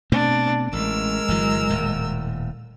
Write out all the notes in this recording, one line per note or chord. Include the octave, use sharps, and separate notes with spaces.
B2 A3 C4 D4
A1 G#3 A#4 E6
G1 E3 F#3
D#1 A2